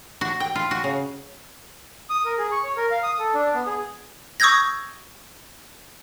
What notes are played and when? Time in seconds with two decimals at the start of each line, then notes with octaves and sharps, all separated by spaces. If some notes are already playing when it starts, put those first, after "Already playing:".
0.21 F#4
0.40 G5
0.55 F4
0.71 F#4
0.84 C#3
2.10 D#6
2.25 A#4
2.38 G#4
2.52 C#6
2.64 C#5
2.77 A#4
2.91 F5
3.03 D#6
3.19 A4
3.34 D4
3.54 B3
3.67 G#4
4.40 C#6 D#6 E6 G6 G#6 A#6